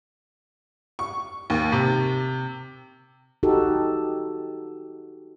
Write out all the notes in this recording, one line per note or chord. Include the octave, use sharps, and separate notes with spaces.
C#6
D#2
C3
D#4 F#4 G4 A4